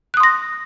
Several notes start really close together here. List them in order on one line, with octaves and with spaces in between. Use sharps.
F#6 D#6 C6 A#6